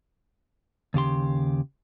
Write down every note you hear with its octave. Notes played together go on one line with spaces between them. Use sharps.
D#2 C#3 G4 C6